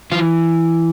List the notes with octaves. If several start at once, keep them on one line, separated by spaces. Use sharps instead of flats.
E3 F4